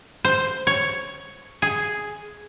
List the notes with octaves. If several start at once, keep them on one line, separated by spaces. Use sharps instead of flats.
C5
C#5
G#4